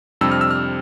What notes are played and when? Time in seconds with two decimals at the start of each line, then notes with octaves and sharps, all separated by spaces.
0.21 F2 C3 G3 D4 E6
0.32 F6
0.41 E6
0.51 F6